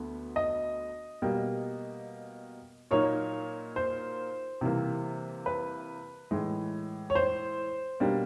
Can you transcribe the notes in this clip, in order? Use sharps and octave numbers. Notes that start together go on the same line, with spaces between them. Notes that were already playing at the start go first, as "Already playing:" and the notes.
Already playing: D2 D3 B3
D#5
B2 G3 A#3
A#2 F#3 A#3 D#4 C#5
C5
C3 E3 G3 A#3
B4
A2 E3 G#3
C#5
C5
B2 G3 A#3 D4